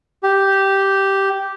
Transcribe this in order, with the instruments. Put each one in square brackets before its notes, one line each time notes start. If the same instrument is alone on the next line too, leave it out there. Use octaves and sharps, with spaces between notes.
[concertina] G4